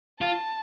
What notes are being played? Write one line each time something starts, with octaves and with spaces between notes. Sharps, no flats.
F4 A5